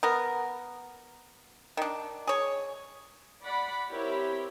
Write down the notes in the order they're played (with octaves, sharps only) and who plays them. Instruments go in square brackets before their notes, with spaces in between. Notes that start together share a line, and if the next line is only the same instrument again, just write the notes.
[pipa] B3 A#4
D#3 D4
G#4 C#5
[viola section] D5 F#5 B5
C4 E4 G4 A#4 C#5 B5